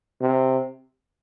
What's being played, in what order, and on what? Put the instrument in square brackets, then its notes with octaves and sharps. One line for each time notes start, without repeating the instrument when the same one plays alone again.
[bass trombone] C3